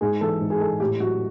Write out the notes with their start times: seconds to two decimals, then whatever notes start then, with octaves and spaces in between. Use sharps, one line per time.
0.01 G#2 G#4
0.21 E3 A4
0.40 G#2
0.50 G#4
0.60 G#3 A4
0.80 A2 G4
1.00 F#3 F#4